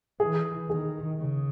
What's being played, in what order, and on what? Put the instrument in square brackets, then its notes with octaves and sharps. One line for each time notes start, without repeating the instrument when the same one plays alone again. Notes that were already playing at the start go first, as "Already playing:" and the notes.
[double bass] E3 [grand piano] G#4
[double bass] D#3 [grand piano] G#4
[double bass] C#3